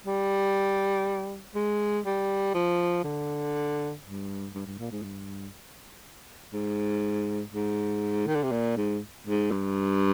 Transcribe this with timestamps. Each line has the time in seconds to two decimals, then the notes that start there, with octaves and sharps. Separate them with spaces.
0.06 G3
1.55 G#3
2.05 G3
2.54 F3
3.04 D3
4.04 G2
4.54 G2
4.66 G2
4.79 A#2
4.91 G#2
5.03 G2
6.53 G#2
7.52 G#2
8.27 D#3
8.35 D3
8.44 C3
8.51 A#2
8.77 G#2
9.27 G#2
9.51 G2